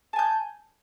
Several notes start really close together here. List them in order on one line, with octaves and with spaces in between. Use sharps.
A5 G#5 G6